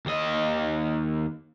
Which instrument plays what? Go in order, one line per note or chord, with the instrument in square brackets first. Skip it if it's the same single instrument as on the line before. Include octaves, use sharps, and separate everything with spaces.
[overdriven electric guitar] D#2 D#5